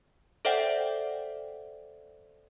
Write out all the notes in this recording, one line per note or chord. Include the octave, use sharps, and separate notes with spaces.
A4 C5 D5 E5 F#5 G5